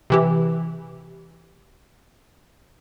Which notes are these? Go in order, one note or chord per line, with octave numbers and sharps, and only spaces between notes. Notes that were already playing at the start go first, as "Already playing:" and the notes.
C3 E3 G4